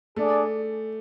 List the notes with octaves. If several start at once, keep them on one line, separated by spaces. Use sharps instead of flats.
A3 D4 G#4 D5